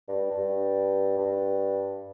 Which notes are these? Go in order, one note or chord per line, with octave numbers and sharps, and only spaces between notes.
G2
G2
G2